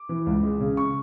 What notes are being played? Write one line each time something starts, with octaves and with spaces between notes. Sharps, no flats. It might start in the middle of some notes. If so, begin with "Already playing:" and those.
Already playing: D6
E3
C#2
G#3
C#3
C#6